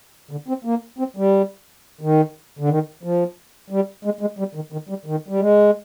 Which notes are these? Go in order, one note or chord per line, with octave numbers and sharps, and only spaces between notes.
D3
C4
A#3
C4
G3
D#3
D3
D#3
F3
G3
G#3
G#3
G3
D#3
D#3
G3
D#3
G3
G#3